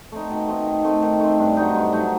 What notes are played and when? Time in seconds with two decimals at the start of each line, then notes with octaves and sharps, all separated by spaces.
0.12 A3 C4 D#4
0.30 B2
0.48 A3 C4 D#4
0.66 D#3
0.84 A3 C4
1.03 D#3
1.20 A3 C4
1.38 G2
1.57 F#3 A3 D#4
1.74 G2
1.93 F#3 A3 D#4